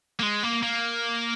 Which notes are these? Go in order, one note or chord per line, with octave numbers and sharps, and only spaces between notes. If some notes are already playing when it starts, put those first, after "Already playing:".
A#3
G#3
A#3
A#3